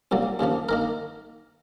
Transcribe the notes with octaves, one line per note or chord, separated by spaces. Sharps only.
C2 A#2 F#3 A#3
D#2 C#3 F3 A#3
D#3 A#3 A#4